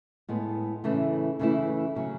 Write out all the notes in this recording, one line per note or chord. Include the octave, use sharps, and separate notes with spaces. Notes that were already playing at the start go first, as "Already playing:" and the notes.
A2 G#3 B3
C#3 E3 A3 E4
C#3 E3 A3 E4
C#3 F#3 C#4